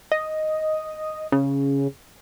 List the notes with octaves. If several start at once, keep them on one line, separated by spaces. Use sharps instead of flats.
D#5
C#3